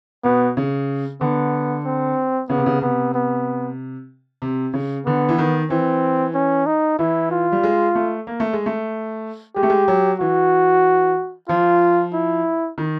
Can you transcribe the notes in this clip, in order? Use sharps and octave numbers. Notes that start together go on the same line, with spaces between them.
B2 B3
C#3
D3 B3
C4
C#3 B3
C3
C#3
C3 B3
B3
C3
C#3
D3 B3
E3
D#3
E3 C4
C#4
D#4
E3 E4
F4
G3
G#3
A3
A#3
A3
G#3
A3
G#3 G4
A3
G#3
F#3
E3 F#4
F3 F4
E4
D#3